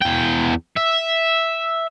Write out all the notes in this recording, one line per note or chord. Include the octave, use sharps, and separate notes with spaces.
E2 G5
E5